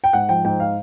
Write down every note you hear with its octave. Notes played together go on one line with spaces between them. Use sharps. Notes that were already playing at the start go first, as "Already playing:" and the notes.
G5
G#2 F#5
F3 G5
G#2 G5
F5